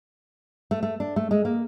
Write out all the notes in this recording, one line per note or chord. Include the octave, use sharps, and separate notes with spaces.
A3
A3
D4
A3
G#3
A#3